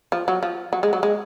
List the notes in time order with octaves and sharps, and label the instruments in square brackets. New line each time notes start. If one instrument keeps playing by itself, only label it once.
[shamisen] F3
F#3
F3
F#3
G#3
F#3
G#3